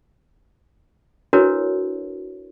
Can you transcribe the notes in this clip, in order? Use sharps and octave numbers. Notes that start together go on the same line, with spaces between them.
D4 E4 F#4 A#4 B4 C#5